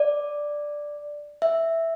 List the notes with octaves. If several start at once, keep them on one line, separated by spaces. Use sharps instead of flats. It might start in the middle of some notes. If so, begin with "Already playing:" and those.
Already playing: D5
E5